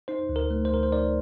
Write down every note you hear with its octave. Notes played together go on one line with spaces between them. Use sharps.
D#4 C5
D2
A#4
A3
C5
D2 A#4
C5
D#4 A#4 D5